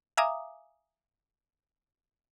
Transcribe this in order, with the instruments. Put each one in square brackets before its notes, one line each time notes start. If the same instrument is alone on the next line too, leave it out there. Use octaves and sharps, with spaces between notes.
[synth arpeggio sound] E5 F5 G#5 A#5 D6 D#6